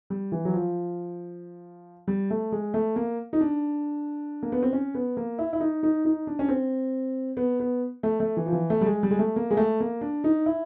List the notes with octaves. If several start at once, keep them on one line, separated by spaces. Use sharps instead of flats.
G3
E3
F#3
F3
G3
A3
G#3
A3
A#3
D#4
D4
A#3
B3
C4
C#4
B3
A#3
E4
E4
D#4
D#4
D#4
D4
C#4
C4
B3
B3
A3
A3
E3
F3
E3
A3
G3
G#3
G3
G#3
A3
A#3
G#3
A3
A#3
D4
D#4
E4